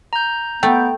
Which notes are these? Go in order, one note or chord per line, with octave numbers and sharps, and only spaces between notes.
A#5 G6
A3 B3 G5